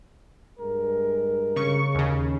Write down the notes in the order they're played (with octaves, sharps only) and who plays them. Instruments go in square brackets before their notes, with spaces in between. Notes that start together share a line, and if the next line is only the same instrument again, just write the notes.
[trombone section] G2 G#3 A#4
[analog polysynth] C#3 C#6
D#2 C#3